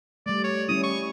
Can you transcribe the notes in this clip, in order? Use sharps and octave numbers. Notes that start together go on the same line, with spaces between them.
G3 A3 D5
C#5
G3 C#4 E4 D#6
C#6